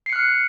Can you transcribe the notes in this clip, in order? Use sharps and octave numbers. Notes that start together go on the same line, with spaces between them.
F6 F#6 C7 C#7